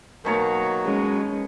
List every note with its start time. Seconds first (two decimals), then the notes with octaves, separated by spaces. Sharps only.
0.25 B2 D#3 F#3 A#3 F#4 C#5
0.84 G#3 C#4